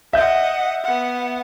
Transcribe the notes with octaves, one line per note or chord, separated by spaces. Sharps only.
D#5 E5 F#5 G6
B3 F#5